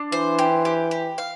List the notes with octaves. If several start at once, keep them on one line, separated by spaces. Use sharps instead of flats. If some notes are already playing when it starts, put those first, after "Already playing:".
Already playing: D4
E3 C5
G4
G4
G4
F5